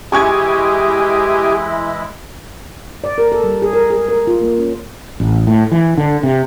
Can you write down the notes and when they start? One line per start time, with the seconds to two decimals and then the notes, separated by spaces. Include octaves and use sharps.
0.12 E3 G#3 E4 G4 G#4 G#5 C#6 G#6
3.04 D5
3.18 A#4
3.32 A4
3.44 G3
3.62 G#4
3.73 A#4
3.90 G#4
4.08 A#4
4.27 F4
4.41 A#3
4.59 C#4
5.20 A1
5.47 A2
5.72 E3
5.98 D3
6.23 C3